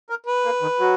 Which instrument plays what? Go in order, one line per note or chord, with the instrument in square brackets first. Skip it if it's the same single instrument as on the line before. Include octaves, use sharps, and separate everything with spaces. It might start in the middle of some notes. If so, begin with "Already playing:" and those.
[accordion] A#4
[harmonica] B4
[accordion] A#3
D#3
F#3